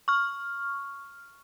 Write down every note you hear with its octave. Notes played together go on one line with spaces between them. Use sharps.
C#6 F6